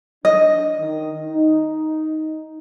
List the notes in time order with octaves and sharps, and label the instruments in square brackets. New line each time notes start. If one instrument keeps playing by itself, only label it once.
[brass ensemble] D4 [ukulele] D#5
[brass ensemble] D#3
D#4